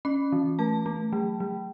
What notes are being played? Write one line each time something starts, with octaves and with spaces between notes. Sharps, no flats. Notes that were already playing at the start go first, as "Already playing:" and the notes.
C#4 B5
E3
A3 A5
A3
F#3
F#3